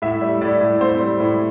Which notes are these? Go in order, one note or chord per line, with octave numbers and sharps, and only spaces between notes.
A2 E5
G3
A2 D5
A2
C4 C5
G3
A2